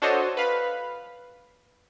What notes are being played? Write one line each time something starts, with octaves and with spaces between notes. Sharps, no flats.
D4 F#4 A4 C5 C#5 D#5
B4 F5 B5